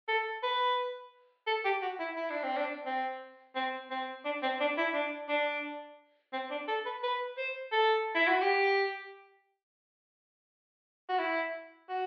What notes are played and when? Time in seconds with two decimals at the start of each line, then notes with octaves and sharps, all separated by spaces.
0.08 A4
0.43 B4
1.47 A4
1.64 G4
1.82 F#4
1.99 E4
2.16 E4
2.30 D4
2.43 C4
2.56 D4
2.86 C4
3.55 C4
3.90 C4
4.25 D4
4.42 C4
4.60 D4
4.77 E4
4.94 D4
5.29 D4
6.33 C4
6.51 D4
6.68 A4
6.86 B4
7.03 B4
7.37 C5
7.72 A4
8.15 E4
8.28 F#4
8.42 G4
11.09 F#4
11.19 E4
11.89 F#4